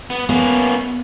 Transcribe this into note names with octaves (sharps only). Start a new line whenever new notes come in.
B3
A#3 B3 C#4